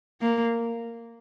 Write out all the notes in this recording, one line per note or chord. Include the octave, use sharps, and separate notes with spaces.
A#3